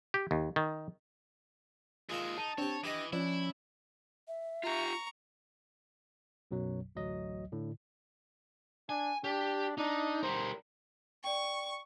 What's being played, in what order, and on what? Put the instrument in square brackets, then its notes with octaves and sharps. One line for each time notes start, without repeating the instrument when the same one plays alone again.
[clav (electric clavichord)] G4
D#2
D#3
[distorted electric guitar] D#2 G#3 [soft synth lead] F4 [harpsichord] G#4 A#4 E5
[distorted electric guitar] D#4 [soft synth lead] A5
[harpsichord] C4 G4 [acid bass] D4 [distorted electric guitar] C#5
[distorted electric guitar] E3 [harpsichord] E4 G4 D#5 [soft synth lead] D#6
[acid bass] F3 [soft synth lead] C#4 [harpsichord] D4 [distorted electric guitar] E4
[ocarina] E5
[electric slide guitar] F4 G4 [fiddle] A#5 C#6
[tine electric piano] B1 F#2 B2 F#3
A1 D2 F#3 D#5
A2 D3
[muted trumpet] D4 [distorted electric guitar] G#5
[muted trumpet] D4 [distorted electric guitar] G4
[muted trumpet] D4 [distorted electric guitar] D#4
[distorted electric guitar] G3 A#4 [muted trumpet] C5
[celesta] D5 G5 [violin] C#6